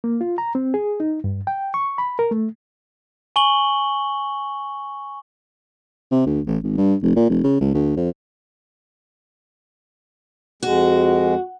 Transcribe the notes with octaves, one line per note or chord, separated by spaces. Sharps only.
A#3
F4
A#5
C4
G#4
D#4
G2
G5
C#6
B5
A#4
A3
G#5 C#6 F#7 G7
C3
D2
A1
G#1
G2
F1
A#2
F1
C#3
C#2
D2
F2
F2 G#3 F#4